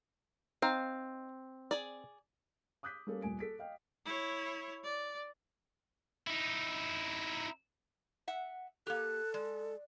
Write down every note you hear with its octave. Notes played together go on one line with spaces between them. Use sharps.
C4 D#4 F5
G#4 D5
D6 D#6 F#6 G6 B6
G3 A#3 C#4 A4
D#1 C2 G#5 D7
A4 B6 D7
D#5 F5 G5
E4 C#5
D5
D#4 E4
E5 F#5
A#3 G4 A4 F#6
G#3 D5